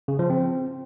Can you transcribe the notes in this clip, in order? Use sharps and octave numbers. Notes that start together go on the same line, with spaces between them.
C#3
F3
C4